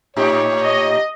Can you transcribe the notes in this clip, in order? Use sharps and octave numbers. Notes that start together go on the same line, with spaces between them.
A2 D#4 G4 C#5
D#5